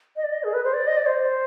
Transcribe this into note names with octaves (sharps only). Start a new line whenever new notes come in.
D#5
D5
D#5
G#4
B4
C5
D5
D#5
D5
C5